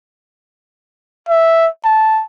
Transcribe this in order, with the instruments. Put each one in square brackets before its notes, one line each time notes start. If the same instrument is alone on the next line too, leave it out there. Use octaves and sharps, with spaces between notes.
[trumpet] E5
A5